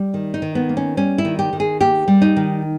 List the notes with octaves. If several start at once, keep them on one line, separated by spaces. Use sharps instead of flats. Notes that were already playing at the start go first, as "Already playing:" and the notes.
Already playing: G3
D#3
D#4
D#3
B3
A#3
C#4
G3 C#4
E4
D#3
G4
D#3
G#4
A#3 G4
G3
D#4
D#3